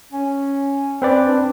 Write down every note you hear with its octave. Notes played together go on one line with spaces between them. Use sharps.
C#4
C4 B4 D5
D4